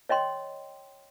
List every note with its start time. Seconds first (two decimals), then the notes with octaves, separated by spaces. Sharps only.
0.09 C#5 D#5 G5 C6